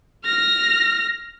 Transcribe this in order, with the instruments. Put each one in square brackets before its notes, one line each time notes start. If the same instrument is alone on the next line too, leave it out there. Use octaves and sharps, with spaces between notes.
[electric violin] F6 A#6